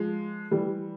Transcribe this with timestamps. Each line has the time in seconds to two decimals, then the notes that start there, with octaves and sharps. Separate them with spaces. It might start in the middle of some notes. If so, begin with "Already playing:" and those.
Already playing: F3 G#3
0.51 E3 G3